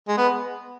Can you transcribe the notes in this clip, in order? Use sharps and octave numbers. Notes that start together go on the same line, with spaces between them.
G#3
B3